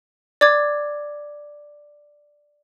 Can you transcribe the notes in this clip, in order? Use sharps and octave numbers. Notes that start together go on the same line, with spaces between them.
D5 D6 G#6